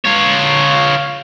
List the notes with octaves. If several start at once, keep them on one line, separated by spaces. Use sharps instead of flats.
F4 C#5